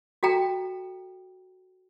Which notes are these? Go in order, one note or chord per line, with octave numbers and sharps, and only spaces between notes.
F#4 A4 G5 A#5